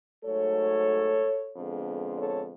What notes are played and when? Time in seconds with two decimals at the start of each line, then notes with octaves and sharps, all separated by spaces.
0.24 G#2 F#3 A3 A4 C#5
1.54 F2 D3 G#3 B3
2.17 A4 C#5